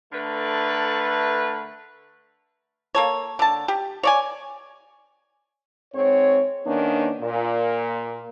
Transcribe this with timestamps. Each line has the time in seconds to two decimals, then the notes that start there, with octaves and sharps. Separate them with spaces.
0.13 D3 A3 A#4 B4
2.95 A#3 A4 C#5
3.39 D3 A5
3.68 G4
4.03 C#5 D5 G#5
5.93 G#2 C4 C#5
6.65 D#3 A#3 B3 C#4 D4
7.21 A#2